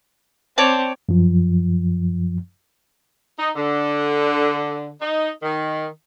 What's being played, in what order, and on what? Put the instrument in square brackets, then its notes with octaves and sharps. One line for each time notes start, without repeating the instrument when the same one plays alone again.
[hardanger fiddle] C4 [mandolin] C#5 D5 A5
[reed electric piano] F#2 F3
[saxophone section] D#4
D3
D#4
D#3